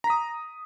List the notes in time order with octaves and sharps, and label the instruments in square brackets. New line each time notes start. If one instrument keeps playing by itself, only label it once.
[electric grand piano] A#5
B6
D#6